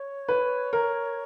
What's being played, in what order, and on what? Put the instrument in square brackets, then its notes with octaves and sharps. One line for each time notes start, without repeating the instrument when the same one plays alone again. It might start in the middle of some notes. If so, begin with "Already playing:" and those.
Already playing: [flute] C#5
[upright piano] B4
A#4